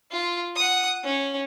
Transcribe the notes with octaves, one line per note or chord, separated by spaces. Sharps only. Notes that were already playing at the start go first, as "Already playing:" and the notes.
F4
F#5 D#6
C#4